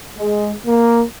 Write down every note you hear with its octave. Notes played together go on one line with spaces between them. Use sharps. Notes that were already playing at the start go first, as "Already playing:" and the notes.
G#3
A#3